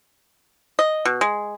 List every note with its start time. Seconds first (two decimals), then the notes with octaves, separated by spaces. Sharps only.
0.79 D#5
1.05 B2
1.21 G#3